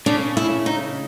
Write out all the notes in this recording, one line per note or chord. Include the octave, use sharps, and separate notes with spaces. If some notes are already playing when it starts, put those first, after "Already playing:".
C#3 D4
E4
D#4